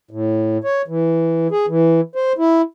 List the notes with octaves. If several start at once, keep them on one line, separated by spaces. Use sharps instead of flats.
A2
C#5
E3
G#4
E3
C5
E4